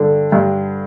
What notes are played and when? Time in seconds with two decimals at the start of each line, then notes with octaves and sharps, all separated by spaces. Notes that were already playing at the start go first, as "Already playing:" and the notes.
Already playing: G2 D3
0.32 G2